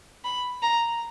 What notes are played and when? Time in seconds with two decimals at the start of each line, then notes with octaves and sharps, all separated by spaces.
0.25 B5
0.62 A#5